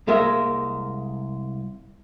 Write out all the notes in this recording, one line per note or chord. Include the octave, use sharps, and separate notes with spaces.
C2 G#3 A#3 A#4 E5